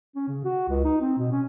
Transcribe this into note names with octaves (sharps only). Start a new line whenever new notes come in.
C#4
C#3
F#4
C#2
D#4
C4
B2
C#4